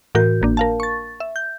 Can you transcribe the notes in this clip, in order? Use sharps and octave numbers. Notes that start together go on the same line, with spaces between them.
A2 E3 F#4 A#4 G6
G#1 A#3 D4
A#4 F5 A5
C#6 A6
E5
G6